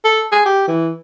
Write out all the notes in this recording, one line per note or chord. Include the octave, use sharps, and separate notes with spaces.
A4
G#4
G4
E3